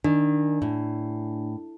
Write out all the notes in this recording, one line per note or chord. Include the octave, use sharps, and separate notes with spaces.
D#3 D4
A2